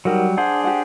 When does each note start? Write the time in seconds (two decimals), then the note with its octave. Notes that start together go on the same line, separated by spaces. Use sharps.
0.05 F#3 G3 D#4 A#4 F#5
0.37 D4 G#4 C5 F#5
0.64 G4 F#5